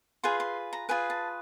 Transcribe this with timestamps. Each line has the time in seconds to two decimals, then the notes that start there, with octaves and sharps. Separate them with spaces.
0.24 F4 G#4 B4 C6
0.40 C6
0.73 A#5
0.89 F4 G#4 B4 G#5
1.10 A5